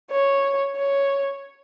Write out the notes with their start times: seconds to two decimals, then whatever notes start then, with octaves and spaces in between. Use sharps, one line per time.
0.11 C#5
0.77 C#5